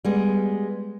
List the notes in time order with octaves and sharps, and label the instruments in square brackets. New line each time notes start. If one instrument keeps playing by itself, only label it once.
[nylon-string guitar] G3 G#3 B3